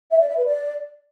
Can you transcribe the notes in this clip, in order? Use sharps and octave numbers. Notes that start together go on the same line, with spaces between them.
E5
D5
E5
B4
D5